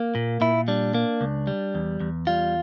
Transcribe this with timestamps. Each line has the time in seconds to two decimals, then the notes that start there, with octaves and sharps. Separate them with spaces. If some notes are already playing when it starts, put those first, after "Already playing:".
Already playing: A#3
0.15 A#2
0.41 A#2 E4
0.68 G3 D4
0.94 A#3
1.21 C#2
1.47 G3
1.75 E2
2.00 E2
2.27 G3 F4